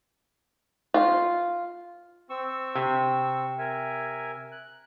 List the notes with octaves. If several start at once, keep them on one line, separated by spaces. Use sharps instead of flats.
F4
C4 C#6 E6
C3
A#4 E5 G#5
F#6